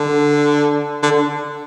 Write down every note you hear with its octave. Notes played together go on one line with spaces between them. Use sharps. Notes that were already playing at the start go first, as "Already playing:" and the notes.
Already playing: D3
D3